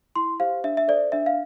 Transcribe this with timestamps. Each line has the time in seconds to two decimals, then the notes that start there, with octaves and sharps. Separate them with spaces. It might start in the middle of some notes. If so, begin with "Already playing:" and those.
0.16 E4 C6
0.40 G4 C5 F5
0.64 D4 E5
0.77 E5
0.88 A4 C5 D5
1.12 D4 E5
1.26 F5